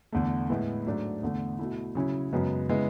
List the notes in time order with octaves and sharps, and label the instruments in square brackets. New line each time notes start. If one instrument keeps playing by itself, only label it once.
[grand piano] E2 D3 A3
A2 G#3 B3 E4
G#2 F#3 A3 D4
E2 D3 A3
B2 A3 E4
C#3 F#3 C#4 E4
F#2 C#3 G#3 B3
C#3 G#3 B3 E4